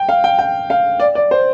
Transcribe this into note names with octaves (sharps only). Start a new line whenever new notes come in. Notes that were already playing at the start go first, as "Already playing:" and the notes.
Already playing: G5
F5
G5
G5
F5
D5
D5
C5